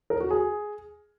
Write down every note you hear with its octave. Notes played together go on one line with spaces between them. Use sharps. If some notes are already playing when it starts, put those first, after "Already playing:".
A#4
F#4
G#4